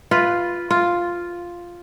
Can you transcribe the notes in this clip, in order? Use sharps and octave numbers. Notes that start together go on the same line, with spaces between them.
F4 B4
F4